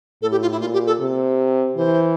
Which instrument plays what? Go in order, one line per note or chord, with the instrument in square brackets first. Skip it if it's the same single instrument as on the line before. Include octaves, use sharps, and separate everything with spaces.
[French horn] A2 [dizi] A4
[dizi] G4
F4
E4
[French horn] A#2 [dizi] F4
[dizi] G4
A4
[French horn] C3
[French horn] E3 [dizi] C5